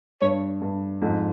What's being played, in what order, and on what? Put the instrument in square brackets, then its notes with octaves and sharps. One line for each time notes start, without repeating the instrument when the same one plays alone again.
[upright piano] G2 [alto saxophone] C#5
[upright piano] G2
F2 G#2